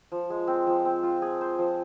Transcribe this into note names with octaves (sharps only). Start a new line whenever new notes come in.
F3
G#3
C4
F3
C4
F4
G#4
C5
F3